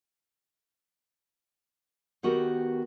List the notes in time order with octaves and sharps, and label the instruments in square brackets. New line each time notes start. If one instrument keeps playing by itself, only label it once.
[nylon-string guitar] D#3 B3 F#4 G4 A#4